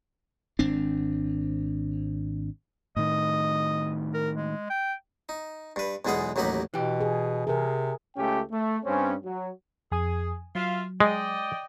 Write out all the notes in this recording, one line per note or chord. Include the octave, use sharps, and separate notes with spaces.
G#1 C4 D4
A2 D#3 D#5
A#4
G#3
G5
D#4
G2 B4
B1 E2 G#3 B3 G#4 F#5
A1 D#2 F#3 D#4 G4 B5
B2 E3 G4
G#4
C3 G#4 A#4
C#2 A3 C#4 G4 G5
A3
G2 C4 C#4
F#3
F2 G#4 G#5 D#6
F#3 F4 E5 F5
G#3 D5 D#5 G5